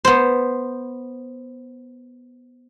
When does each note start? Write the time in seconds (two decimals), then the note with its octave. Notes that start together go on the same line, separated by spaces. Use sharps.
0.05 B3 C5